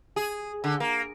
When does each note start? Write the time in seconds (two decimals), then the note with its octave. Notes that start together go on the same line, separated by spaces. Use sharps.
0.16 G#4
0.64 D3
0.80 A#3